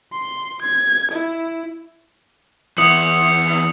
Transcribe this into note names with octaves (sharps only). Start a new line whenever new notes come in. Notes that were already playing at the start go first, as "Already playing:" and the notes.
C6
G#6
E4
E2 E4 D#6 C#7 F#7